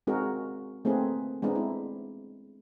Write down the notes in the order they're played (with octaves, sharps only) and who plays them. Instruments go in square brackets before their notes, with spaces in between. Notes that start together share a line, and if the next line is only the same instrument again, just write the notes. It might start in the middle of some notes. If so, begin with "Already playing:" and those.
[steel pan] G#3 C4 D#4 F#4 G#4 A#4
A3 A#3 C4 D#4 G#4 B4
G#3 B3 C4 D4 D#4
E4